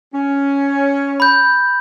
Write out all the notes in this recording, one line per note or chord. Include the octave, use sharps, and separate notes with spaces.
C#4
B5 G6